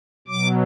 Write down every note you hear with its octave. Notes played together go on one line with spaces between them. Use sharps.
B2 F#3 D6